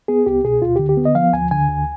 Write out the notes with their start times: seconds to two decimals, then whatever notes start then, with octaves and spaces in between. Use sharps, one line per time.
0.08 B3 G#4
0.26 C2 G4
0.44 B2 G#4
0.62 D2 F4
0.76 D3 G4
0.89 G4
0.97 B3
1.05 D#5
1.15 F3 F5
1.33 D2 G#5
1.51 D3 G#5
1.68 D2